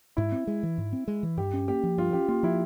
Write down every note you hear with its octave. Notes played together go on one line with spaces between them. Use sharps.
G#2 E4
C4
G#3
E3
G#2
C4
G#3
E3
G2 G4
C#4
A#3 G4
F3
G2 F4
C#4 G4
A#3 F4
F3 E4